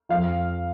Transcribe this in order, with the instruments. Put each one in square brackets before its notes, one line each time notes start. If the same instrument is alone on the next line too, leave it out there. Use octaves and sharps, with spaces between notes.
[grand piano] F2 F3 F5